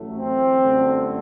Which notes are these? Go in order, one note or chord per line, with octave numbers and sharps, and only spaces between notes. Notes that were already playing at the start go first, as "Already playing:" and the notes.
Already playing: A1 A2 F#3 A3
C4
G1 F#2 D3 A3